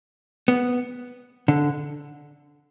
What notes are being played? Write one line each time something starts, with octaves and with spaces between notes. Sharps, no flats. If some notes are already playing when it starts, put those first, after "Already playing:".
B3
D3